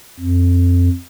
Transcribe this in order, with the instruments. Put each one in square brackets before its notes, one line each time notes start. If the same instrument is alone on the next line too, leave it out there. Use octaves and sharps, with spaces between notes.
[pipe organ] F2